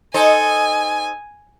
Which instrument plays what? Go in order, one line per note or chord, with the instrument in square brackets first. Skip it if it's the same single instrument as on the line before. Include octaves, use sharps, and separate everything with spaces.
[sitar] D#4 A4 C5 [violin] G#5